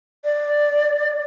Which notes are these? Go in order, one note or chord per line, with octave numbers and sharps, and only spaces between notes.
D5